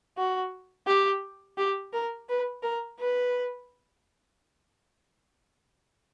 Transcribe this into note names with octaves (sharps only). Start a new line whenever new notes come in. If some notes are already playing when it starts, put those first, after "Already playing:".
F#4
G4
G4
A#4
B4
A#4
B4